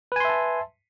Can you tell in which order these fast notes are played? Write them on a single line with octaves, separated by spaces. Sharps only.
B4 G#5 C6 E5 A5